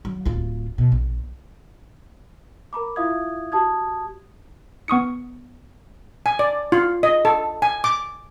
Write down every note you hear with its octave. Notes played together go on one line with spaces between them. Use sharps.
F#3
D1 F4
B2
A#1
A#4 A#5 B5 D6
E4 F4 E5 F5 D#6 G#6
F#4 G4 A5 D#6 G#6
B3 C#6 D#6 C#7
G#5
D5
F4
D#5
A4
G#5
D6